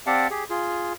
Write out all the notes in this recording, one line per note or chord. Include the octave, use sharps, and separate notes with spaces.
C4 G4 D5 F5 F#5 A5
G4 G#4
F4 G#4